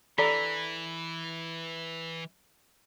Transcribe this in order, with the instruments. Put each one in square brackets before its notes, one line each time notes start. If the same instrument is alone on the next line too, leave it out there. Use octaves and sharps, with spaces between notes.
[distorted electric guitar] E3 [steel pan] A4 D5 A#5 [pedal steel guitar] B5